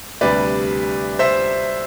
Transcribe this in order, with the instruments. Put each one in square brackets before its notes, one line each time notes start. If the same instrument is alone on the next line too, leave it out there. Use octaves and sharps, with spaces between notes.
[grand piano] D2 C3 G3 D4 B4 D5
C5 E5